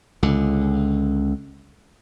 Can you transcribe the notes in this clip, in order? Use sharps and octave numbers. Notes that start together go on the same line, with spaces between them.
C#2 D3